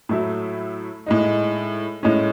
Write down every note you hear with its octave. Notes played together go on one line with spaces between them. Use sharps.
A2 F#3 A3 E4
A2 G#3 D#4
A2 G#3 C#4